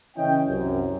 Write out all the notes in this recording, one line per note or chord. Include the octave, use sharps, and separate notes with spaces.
C#3 E3 C#4 E4 D#5 G5
C2 F#2